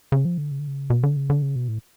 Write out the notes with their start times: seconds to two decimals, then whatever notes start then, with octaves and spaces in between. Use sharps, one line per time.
0.12 C#3
0.25 F3
0.38 D3
0.51 C#3
0.59 D3
0.67 C#3
0.90 B2
1.03 D3
1.17 C#3
1.30 D3
1.42 C#3
1.56 B2
1.68 A2